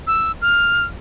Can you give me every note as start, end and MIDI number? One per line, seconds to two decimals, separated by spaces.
0.07 0.32 88
0.42 0.84 89